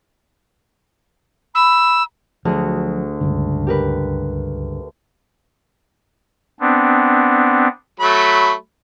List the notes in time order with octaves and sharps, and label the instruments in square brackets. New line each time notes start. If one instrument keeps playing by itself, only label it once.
[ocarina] B5 [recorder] E6
[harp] D2 G#4 [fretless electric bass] F3 F#3
[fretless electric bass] C#2 G2 D3
[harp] G4 A#4 B4
[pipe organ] B3 C4 D4
[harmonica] F#3 A3 B5